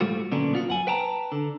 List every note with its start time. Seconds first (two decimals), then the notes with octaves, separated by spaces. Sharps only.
0.01 G#2 G3 A3 F4 F#4
0.31 B1 A#2 D3 B3 C#4 D4
0.53 B3 F4 F#4
0.68 F#2 F#5 G#5
0.87 B4 G5 A5 A#5
1.32 D3